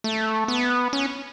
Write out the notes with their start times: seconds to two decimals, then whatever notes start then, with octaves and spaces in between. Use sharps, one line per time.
0.04 A3
0.48 B3
0.93 C#4